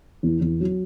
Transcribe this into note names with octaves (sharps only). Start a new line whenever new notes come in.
E2
E2
F#3